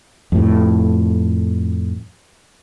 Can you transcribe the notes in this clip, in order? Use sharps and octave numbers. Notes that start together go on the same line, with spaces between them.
F2 A2